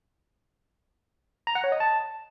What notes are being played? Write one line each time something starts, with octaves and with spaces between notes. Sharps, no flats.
A#5
F#5
C#5
D#5
A5